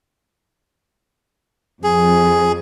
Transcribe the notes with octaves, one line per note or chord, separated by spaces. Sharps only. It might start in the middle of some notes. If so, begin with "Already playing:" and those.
F2 G#4